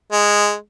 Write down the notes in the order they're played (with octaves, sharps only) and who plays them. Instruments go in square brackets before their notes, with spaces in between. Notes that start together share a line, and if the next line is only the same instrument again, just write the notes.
[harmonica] G#3